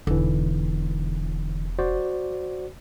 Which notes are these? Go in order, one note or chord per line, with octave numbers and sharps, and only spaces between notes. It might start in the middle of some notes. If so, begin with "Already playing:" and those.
E1 D3 E3 D#4
F#4 C5 D5